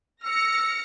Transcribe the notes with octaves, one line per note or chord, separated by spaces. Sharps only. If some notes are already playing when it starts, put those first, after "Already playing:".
E6 F6 A#6 C#7